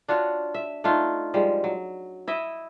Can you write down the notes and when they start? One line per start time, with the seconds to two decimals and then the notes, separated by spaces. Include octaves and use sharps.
0.08 D4 F4 F#4 C#5
0.54 E5
0.84 A3 D4 D#4 F4
1.34 F3 G3 G#3
1.64 F#3
2.28 E4 D#5 E5